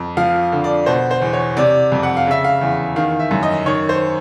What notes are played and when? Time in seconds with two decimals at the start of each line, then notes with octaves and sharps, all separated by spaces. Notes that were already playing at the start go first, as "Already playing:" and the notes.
Already playing: F2
0.17 F3 F5
0.52 D3
0.64 D5
0.86 B2 C5
1.11 C5
1.22 E2
1.33 C#5
1.57 C3 D5
1.92 F2
2.03 F#5
2.17 F5
2.27 C#3 E5
2.44 F5
2.61 E2
2.96 D#3 F5
3.20 E5
3.31 F#2
3.43 D#5
3.66 D#3 C#5
3.89 C5